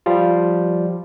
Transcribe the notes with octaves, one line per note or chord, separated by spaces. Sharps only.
F3 G3 F4